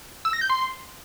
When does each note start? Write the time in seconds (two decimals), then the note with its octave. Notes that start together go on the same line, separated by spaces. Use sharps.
0.25 E6
0.33 A#6
0.41 G6
0.50 C6